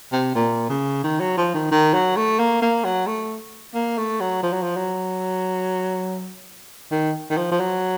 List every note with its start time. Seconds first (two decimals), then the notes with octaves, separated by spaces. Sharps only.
0.12 C3
0.35 A#2
0.69 C#3
1.04 D#3
1.20 F#3
1.37 F3
1.54 D#3
1.71 D#3
1.94 F#3
2.16 A3
2.39 A#3
2.62 A#3
2.84 F#3
3.07 A3
3.74 A#3
3.98 A3
4.20 F#3
4.43 F3
4.53 F#3
4.62 F3
4.76 F#3
6.91 D#3
7.30 D#3
7.37 F3
7.52 F3
7.60 F#3